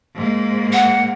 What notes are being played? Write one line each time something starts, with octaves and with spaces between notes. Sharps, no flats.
G#2 A#3
F#5